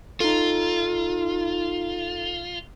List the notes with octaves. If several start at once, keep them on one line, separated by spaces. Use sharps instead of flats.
D#4 F4 A4